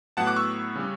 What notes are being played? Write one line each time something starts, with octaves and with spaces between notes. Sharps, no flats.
A2 F#3 B3 E4 F#5 A5
D6 F#6
C#6 E6
C#3 G3 C#4